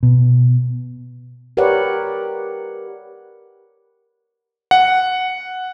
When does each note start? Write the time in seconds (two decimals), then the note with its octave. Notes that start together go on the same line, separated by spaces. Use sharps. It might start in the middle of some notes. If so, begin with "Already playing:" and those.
0.03 B2
1.57 G4 A#4 B4 C#5 D5 F#5
4.71 F#5